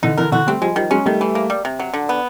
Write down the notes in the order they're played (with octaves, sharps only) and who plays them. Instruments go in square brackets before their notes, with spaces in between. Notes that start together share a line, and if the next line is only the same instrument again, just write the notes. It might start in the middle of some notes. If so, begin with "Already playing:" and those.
[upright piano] D3 E3 [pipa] D#4
[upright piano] D3 E3 [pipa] A#4
[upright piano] D3 E3 [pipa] F#4
[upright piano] G3 A3 [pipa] C4
[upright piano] F3 G3 [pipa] G#3
[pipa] D#3 [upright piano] F3 G3
[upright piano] F#3 G#3 [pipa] C#4
[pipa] D#3 [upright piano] G3 A3
[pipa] E3
A#3
G3
C3
F#3
D3
B3